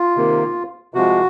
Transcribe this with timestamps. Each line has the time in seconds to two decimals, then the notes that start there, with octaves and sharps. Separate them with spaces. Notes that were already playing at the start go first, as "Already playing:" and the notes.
Already playing: F4
0.16 C3 D#3 A#3
0.94 C3 F3 G#3 F#4